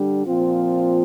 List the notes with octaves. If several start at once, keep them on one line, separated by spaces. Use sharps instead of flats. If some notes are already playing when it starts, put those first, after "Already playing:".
Already playing: D3 G3 D4
A#2 F3 C4 F4